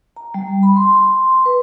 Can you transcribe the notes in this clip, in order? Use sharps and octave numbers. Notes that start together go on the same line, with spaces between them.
A#5
G3
B5
C6
B4